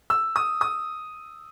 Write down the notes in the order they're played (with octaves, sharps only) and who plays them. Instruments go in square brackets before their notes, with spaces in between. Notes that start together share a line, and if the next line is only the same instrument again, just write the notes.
[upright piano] E6
D#6
D#6